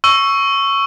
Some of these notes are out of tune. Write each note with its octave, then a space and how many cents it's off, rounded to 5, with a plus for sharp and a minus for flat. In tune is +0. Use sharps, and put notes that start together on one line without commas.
C#6 +0 E6 +10